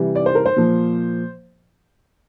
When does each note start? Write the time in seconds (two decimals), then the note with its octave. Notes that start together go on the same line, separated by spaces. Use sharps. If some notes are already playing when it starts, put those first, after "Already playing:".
Already playing: C3 E3 G3
0.15 D5
0.26 C5
0.35 A#4
0.46 C5
0.56 A#2 F3